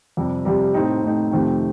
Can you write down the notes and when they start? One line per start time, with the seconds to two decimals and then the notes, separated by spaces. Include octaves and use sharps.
0.17 F2 C3 G3
0.45 F2 C3 G3
0.74 A2 A3 C4 D#4
1.02 A2 A3 C4 D#4
1.31 F2 C3 D#3 A3 C4